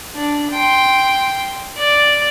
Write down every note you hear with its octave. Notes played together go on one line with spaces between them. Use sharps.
D4
G5 C6
D5